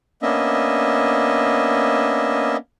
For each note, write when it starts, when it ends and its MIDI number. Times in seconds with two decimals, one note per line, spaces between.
0.22 2.56 58
0.22 2.56 59
0.22 2.56 61
0.22 2.56 62
0.22 2.56 75
0.22 2.56 76